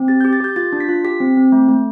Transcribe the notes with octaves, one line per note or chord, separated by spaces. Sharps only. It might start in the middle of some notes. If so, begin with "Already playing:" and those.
Already playing: C4
G4 A6
G6
G4
A6
G4 G6
F4 A6
D4
B6
F4
G4 B6
C4
C4
A3
A3